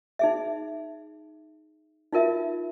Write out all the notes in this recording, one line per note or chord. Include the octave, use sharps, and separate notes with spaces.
D#4 G#4 E5
D#4 F4 A#4 E5